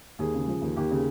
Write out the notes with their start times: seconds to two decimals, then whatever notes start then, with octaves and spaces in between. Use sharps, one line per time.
0.19 D#2 G#4
0.34 C#3
0.48 F3
0.62 D#2
0.76 D#2 G4
0.91 C#3